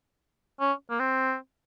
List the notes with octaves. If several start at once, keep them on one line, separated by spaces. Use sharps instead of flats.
C#4
A#3
C4